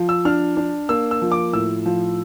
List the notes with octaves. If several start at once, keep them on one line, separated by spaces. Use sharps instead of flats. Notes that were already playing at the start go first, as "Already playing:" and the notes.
Already playing: F3
E6
D4 F6
D4
A#3 E6
E6
F3
D6
A2 E6
F3